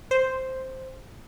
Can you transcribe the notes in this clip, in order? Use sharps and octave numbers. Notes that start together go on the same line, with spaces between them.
C5